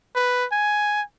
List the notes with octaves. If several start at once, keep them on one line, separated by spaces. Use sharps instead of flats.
B4
G#5